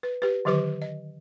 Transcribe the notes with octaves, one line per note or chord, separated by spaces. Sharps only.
B4
G4 B4
D3 D#3 F#3 G4 B4 D6
D#5